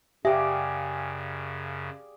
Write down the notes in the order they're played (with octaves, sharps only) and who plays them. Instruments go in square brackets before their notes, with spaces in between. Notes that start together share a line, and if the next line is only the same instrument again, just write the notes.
[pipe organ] F#2 C#3 [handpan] G4 [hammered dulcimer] G#4 D5 F5 [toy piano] E5